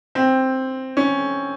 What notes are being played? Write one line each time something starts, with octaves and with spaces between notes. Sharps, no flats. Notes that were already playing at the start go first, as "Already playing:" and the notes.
C4
C#4